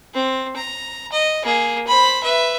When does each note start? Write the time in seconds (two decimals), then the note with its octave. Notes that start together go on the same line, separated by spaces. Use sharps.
0.14 C4
0.56 A#5
1.12 D#5
1.43 A#3 G#4
1.87 C5 B5
2.24 B4 E5